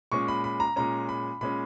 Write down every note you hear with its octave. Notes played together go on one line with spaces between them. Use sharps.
A#2 G#3 C#4 C#6
B5
B5
A#5
A#2 G#3 C#4 A#5
B5
A#2 G#3 C#4 B5